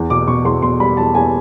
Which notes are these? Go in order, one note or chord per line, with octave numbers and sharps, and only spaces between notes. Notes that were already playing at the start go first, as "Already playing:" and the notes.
Already playing: E2
B2 D6
B2 C#6
E2 C6
B2 C6
G3 B5
E2 A5
E2 G#5